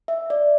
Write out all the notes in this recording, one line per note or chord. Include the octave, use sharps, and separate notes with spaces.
E5
D5